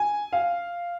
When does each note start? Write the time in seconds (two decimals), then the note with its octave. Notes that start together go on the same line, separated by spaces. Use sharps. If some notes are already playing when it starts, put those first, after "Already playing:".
Already playing: G#5
0.33 F5